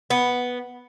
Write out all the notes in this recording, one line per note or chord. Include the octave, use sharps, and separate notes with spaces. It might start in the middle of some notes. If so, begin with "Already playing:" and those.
B3